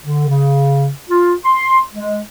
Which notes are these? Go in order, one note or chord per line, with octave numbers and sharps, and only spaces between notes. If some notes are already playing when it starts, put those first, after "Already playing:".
D3
C#3
F4
C6
G#3